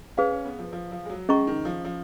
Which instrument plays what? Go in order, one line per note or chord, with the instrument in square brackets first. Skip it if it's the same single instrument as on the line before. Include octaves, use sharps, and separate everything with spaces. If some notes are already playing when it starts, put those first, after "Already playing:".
[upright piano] C#4 [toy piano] G#4 B4 F5
[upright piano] C#4
B3
F3
F3
F3
G#3
F#3
[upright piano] G#3 [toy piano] C#4 G#4 D#5 A#5 C#6
[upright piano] D#3
F3
F3